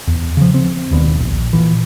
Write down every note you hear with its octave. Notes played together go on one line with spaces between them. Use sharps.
E2
C#3 F3
C4
E1 D#2 B3 D4
A#1
A#2 E3